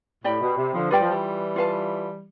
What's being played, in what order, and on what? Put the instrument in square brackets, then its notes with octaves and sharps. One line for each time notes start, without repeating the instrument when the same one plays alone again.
[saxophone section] A2 [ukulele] G4 D5 G5 B5
[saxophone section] B2
C3
D3 F3
[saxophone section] G3 [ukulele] F4 B4 D5 G5
[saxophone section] F3
E3 G3
[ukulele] F4 B4 F5 A5